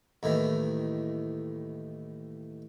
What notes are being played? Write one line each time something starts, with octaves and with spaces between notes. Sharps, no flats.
D#2 A2 D#3 E3